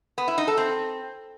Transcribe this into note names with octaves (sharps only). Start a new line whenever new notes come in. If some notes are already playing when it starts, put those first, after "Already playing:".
B3
E4
D#4
A4
C4